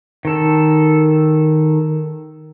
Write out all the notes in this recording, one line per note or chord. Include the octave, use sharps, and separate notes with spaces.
D#3 A4